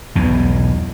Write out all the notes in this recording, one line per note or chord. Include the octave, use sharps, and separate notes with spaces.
B1 E2 B2